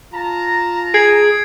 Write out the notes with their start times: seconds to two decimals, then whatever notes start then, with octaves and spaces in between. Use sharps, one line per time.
0.14 F4 A5 A#5
0.94 G#4 G#6 C7 D7